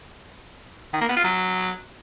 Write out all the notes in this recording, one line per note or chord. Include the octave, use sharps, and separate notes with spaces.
D#3
A#3
B3
F4
F#3